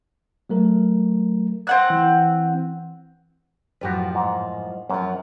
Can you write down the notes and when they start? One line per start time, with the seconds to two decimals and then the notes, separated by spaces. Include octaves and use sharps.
0.49 F#3 A3 A#4
1.67 C4 F#5 F#6
1.90 E3
3.81 F#2 A2 F3 F#4 G4 B4
4.15 G#2
4.89 F#2 F3 C#4